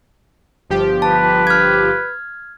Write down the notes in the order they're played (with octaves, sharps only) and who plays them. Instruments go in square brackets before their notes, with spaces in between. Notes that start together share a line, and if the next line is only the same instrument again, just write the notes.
[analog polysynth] G1 F3 G4
[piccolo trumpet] B4 [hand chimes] A5
[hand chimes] F6 G#6